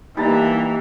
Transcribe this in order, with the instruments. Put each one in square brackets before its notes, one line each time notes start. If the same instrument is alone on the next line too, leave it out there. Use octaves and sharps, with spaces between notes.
[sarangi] E3 [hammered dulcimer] G3 A5 A#5 [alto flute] A#3 [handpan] B3 D#4